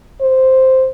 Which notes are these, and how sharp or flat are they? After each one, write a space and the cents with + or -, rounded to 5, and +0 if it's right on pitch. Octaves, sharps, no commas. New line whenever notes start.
C5 +0